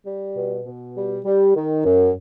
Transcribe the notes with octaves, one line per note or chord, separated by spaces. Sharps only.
G3
B2
B2
G3
G3
D#3
F#2